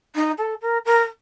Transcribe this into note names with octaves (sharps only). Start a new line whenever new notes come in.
D#4
A4
A#4
A#4